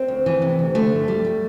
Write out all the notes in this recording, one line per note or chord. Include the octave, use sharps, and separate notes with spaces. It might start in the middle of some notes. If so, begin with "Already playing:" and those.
Already playing: C4
D2
E3
C3
D2
D3 A3
G2
G3
G3